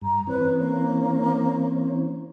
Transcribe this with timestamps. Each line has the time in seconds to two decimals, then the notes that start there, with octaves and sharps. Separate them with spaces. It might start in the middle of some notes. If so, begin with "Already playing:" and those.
0.01 G2 A#5
0.27 E3 C4 C#4 B4
0.59 A#3